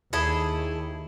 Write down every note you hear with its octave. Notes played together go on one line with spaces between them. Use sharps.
D#2 E4 G#4 A4